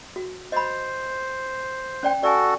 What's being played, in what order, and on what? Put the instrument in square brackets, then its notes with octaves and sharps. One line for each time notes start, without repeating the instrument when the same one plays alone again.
[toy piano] F#4
[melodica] C5 [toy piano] D#5 B5
[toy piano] C#4 D5 G5
[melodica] F#4 A4 [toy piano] D5 G#5